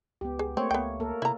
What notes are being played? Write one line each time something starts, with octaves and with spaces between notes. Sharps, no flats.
C#2 B3 G4
G#4
A3 A#3 C4 C#5
C#2 B3 G5
A#3 A4 A#4
C3 E4 A#5